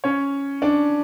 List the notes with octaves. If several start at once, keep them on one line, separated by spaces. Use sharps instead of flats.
C#4 C#5
D4 D5